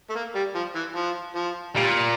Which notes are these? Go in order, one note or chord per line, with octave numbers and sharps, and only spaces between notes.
A3
A#3
G3
F3
E3
F3
F3
A#2 G3